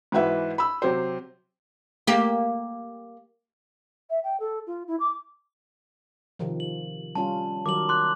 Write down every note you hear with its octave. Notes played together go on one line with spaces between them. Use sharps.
G#2 E3 F#4 B4 E5
B5 E6
C3 F#3 G4 C5
A#3 G4
E5
G5
A4
F4
E4
D6
C3 D#3 F3
F#7
G3 C#4 F4 A5
D#3 F#3 A#4 D6 F#7
C6 D6 F#6